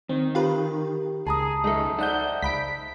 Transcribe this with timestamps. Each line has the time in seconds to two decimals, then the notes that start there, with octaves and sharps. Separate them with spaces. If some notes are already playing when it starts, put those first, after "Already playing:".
0.09 D#3 C4
0.35 F4 G4 A#4 B4
1.27 C#2 G#4 A5 A#5 D#6
1.64 F#2 G#3 A3 D#4
1.98 D#4 C5 D5 E5 F#5 G6
2.42 C#2 B5 B6 D7